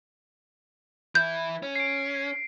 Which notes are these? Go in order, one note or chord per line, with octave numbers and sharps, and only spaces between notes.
E3 E4 G6
C#4
C7 D7